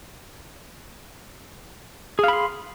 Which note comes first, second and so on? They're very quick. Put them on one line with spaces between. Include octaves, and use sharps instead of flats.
G#4 F5 B5 C6